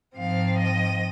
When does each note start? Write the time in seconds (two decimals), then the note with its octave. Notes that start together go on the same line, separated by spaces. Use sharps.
0.16 G#2 F3 C4 F5
0.58 D#5